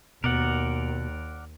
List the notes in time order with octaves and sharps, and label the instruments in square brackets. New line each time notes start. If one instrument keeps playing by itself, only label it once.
[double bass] D#2 [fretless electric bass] B2 [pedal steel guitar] A#4 D5 F#5